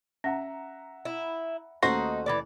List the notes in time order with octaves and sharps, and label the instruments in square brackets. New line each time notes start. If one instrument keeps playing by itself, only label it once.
[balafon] C#4 [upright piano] E5 F#5 A#5
[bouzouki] E4
[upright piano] D#2 A3 [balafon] C#4 [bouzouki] D#4 [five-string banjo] F#4 C5
[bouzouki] E3 F3 D5